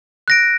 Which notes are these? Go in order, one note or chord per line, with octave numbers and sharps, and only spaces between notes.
F#6 A#6 D7